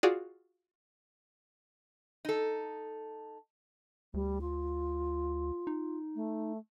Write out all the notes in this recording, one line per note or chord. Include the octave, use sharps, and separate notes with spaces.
F4 F#4 G#4 D5
D#4 A4
D2 G3
F4
D#4
A3